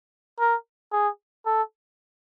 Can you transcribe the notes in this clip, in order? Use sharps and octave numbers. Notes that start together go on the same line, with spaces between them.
A#4
G#4
A4